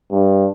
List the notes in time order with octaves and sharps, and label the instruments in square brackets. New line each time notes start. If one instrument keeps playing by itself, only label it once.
[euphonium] G2